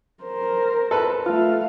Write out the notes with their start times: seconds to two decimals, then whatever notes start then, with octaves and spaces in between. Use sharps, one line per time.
0.24 A#4 C5
0.91 A4 B4
1.26 A3 F4 F5